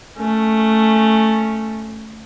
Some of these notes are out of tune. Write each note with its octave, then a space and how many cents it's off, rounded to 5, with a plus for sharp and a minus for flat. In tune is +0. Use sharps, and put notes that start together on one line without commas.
A3 +0 C#4 +0